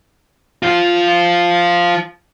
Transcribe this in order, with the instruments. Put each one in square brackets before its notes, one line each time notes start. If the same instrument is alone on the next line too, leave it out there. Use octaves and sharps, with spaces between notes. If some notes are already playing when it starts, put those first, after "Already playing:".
[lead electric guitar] F3 F4